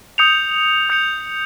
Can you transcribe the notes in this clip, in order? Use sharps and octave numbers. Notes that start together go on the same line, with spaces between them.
D#6 G6 C#7 F7
D#6 G6 C#7 F7